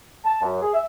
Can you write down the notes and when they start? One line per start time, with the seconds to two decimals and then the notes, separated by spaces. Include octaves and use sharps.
0.25 A5
0.41 F#2
0.62 G#4
0.74 E5